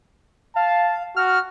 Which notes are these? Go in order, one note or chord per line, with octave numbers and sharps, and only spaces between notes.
F5 A5
F#4 F6